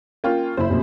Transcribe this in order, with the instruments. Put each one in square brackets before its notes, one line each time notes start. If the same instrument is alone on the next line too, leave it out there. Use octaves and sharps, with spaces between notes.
[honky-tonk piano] A#3 C#4 F4 [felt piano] G5
[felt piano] F#1 E4 [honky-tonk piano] C5 B5
[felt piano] F1 A#1 F#2